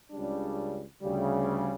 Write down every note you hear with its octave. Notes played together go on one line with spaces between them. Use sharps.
C#2 C#3 G3 D4
D2 C#3 G3